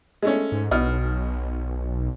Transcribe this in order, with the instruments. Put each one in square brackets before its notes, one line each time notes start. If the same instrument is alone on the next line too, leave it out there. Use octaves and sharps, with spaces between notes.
[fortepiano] G#3 A3 C#4
[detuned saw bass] G#2
[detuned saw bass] B1 [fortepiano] B2 F6